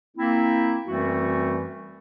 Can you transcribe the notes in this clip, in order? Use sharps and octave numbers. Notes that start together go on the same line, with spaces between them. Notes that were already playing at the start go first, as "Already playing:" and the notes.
A#3 C4 E4
F#2 E3 G3 A3 C4 F#4